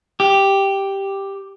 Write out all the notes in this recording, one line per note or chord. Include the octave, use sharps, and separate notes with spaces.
G4